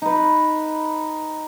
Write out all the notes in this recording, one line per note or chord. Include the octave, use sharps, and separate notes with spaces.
D#4 B4